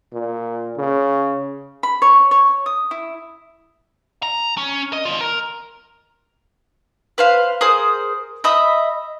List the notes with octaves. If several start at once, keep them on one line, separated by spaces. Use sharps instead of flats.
A#2
C#3
B5
C#5
C#5
D#6
E4
A#5
C#4
D#5
B3 F4
A#4
B4 C5 F5
G#4 A#4 C5 D#6
D#5 E5 B5 D#6